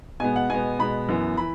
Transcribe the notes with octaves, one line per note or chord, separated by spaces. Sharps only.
B2 G#3 B3 G#5
F#5
B2 G#3 B3 G#5
B2 G#3 B3 B5
F#2 E3 B3
E3 B5